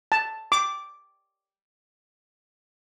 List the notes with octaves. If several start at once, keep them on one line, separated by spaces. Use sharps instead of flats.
A5
D6